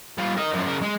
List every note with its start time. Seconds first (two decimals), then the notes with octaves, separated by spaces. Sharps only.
0.18 G3 F4
0.37 A#4 D#5
0.53 F#2 F3
0.65 C#3 A#4
0.82 G#3